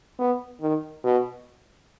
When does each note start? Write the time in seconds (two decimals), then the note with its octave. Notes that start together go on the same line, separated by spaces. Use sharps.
0.19 B3
0.61 D#3
1.04 B2